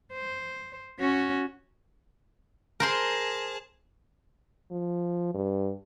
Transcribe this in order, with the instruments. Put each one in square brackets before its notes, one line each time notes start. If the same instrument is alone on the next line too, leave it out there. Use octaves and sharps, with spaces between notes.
[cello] C5
C#4 F#4
[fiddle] G#4 A5 [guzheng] A#4 C5 C6
[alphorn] F3
G2